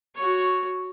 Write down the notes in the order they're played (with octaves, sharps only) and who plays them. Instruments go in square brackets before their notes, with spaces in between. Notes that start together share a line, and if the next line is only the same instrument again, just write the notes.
[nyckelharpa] F#4 C#5